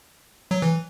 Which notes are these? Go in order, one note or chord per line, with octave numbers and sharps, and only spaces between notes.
F#3
E3